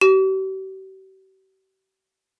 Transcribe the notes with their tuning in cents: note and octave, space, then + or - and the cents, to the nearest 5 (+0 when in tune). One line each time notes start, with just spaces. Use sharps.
G4 -45